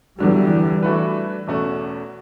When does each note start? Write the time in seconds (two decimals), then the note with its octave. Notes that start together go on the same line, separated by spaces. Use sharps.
0.19 E2 D3 E3 F#3 G3
0.83 E3 A3 D4 F#4 B4
1.47 E2 B2 A3 C#4 F#4